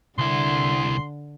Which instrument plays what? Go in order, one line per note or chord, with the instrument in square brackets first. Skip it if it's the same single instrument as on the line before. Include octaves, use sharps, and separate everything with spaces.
[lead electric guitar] C2 E4 [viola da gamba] D3 [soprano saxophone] C6